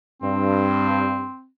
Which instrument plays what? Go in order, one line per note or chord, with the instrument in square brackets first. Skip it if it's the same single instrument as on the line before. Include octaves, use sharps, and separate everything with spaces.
[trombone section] G2 [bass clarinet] C4